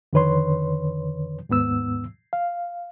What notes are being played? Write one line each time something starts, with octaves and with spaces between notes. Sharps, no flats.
F2 D3 D#3 B4 C#5 C6
D#2 G#2 B3 E6
F5